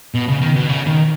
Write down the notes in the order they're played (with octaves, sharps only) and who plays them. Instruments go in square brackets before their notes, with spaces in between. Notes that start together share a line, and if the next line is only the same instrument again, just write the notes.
[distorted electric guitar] B2
C#3
D#3
B2
C#3
D#3